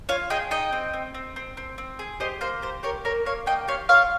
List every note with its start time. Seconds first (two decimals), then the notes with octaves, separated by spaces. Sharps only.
0.09 F4 C#5 F5
0.30 G#4 D#5 G5
0.51 D#4 D#5 G5
0.72 C4
0.93 C4
1.14 C4
1.36 C4
1.57 C4
1.78 C4
1.99 G#4
2.20 G4 C5 D#5
2.41 A#3 C5
2.62 G4 C5
2.83 G4 A#4 C#5
3.05 A#3 A#4 C#5
3.26 A#3 C#5 F5
3.46 A#3 D#5 G5
3.68 G4 C#5 F5
3.89 F4 C#5 F5